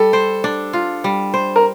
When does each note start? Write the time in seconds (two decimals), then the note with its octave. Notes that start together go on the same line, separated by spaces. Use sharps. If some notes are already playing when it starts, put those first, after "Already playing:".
Already playing: G3 A4
0.13 C5
0.44 D4
0.73 F4
1.04 G3
1.34 C5
1.56 A#4